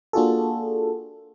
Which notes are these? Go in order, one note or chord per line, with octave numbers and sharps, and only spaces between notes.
A#3 D4 F4 F#4 G#4 A4